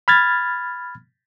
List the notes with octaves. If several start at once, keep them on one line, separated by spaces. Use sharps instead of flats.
B5 F6 G#6 A6